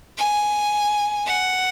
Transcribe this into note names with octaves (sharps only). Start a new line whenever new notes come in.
G#5
F#5